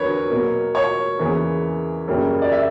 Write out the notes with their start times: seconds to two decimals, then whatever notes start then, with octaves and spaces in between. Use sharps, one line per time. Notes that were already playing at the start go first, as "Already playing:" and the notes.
Already playing: E2 D3 F#3 A#4 B4 C#5
0.30 B2 F#3 A#3
0.75 C#5
1.19 E2 C#3 E3 A#3
2.08 F#2 C#3 G3 A#3
2.42 D5
2.52 E5